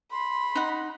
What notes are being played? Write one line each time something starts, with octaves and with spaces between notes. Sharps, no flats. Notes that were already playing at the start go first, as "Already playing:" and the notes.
B5 C6
D#4 F#5